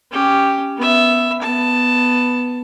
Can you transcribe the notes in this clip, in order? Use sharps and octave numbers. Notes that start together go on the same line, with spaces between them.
C#4 G4
B3 E5
B3 A5